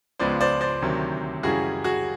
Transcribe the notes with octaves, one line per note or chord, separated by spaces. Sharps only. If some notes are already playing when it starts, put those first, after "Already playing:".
C#2 C#3 F3 G#3 B3 C5 D5
C5 D5
C5 D5
D2 C3 D#3 F#3
F#2 C#3 E3 G3 F#4 G#4
F#4 G#4